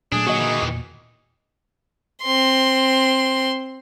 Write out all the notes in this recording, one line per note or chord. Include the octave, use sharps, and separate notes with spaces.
A#2 F#3 A3 D4 G#4
A#2 D3 F#3 A#3 F#4 D#5
D#3 E3
E2 A#2
C4 C6